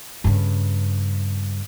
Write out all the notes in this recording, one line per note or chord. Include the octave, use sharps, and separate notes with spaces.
G2 C#3